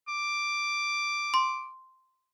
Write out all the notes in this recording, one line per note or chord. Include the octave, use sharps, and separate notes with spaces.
D6
C6